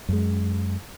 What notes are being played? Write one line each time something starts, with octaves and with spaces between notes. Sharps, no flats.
F#2 G#3